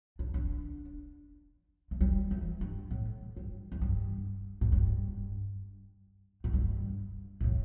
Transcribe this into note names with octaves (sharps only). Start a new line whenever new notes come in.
D4
D4
A3
G3
E3
G2
A2
G2
E2
G2
A2
G2
A2
G2
C3
A2